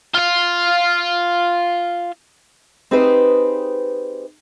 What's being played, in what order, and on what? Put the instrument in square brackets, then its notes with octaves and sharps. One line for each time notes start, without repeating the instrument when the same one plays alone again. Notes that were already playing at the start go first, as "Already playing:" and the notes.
[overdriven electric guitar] F4 F5
[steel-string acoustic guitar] C4 D#4 G4 G#4 B4 C5